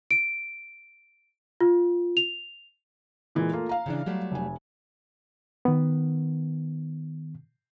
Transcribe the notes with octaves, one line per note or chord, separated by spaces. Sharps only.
D7
F4
F7
A#2 E3 G#3
A3 A#3 F4
F5 A#5
C#3 E3 D4
F#3 G3 A3
F1 G#5
D#3 B3